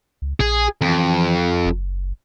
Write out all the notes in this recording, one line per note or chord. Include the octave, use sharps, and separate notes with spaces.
C#2
A#1 G#4
F2 E3
F#1